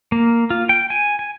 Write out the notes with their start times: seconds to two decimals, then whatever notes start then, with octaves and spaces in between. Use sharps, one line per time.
0.12 A#3
0.50 F4
0.69 G5
0.90 G#5
1.19 G#5